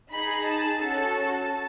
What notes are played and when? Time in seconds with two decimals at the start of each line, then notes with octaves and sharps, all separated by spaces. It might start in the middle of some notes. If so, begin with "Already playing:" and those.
0.11 D#4 G#4 B5
0.44 A5
0.78 C#4 F#4 A4
1.11 A5